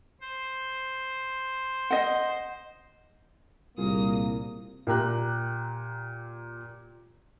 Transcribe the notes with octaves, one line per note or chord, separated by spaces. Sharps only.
C5
D#5 F#5
C2 A#2 G3 A#3 F4 G#4 D#6
A#2 G4 A#5 F#6